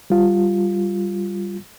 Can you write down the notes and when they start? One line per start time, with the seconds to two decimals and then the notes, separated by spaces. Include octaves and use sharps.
0.10 G3 F4